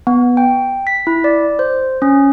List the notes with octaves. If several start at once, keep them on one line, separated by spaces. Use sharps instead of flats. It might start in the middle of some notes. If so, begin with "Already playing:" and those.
B3
G5
B6
E4
D5
C5
C#4